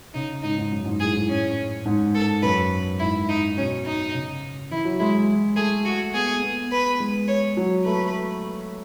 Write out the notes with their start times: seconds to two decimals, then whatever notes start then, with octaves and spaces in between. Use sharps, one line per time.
0.14 C#3 D#4
0.43 G#2 D#4
0.58 G#2
0.71 F#2
0.85 G#2
1.00 A2 G#4
1.15 A2
1.29 C#4
1.85 G#2
2.15 A4
2.42 F#2 B4
2.99 G#2 E4
3.29 D#4
3.57 B2 C#4
3.86 D#4
4.14 C#3
4.71 E3 E4
4.85 F#3
5.00 G#3 E4
5.56 A3 G#4
5.85 F#4
6.14 B3 G#4
6.42 B3
6.71 B4
7.00 G#3
7.28 C#5
7.57 F#3
7.85 A3 B4